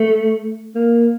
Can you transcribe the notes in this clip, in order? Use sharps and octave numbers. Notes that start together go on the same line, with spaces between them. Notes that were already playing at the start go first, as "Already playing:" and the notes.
Already playing: A3
A#3